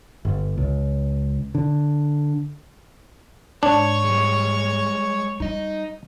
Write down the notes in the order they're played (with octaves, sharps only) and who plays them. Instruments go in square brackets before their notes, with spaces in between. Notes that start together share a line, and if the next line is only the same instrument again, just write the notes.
[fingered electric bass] G1
C#2
D3
[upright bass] G#2 [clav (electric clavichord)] D4 [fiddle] C#5 C#6
[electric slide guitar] G3 G#3
[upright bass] G3 [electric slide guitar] D#4 D#5